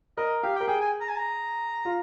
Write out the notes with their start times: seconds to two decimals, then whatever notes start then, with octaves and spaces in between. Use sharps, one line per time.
0.17 A#4 D#5
0.43 G4 F5
0.56 G5
0.60 A#4
0.68 G#4 G5
0.81 G#5
1.01 A#5
1.08 G#5
1.16 A#5
1.85 F4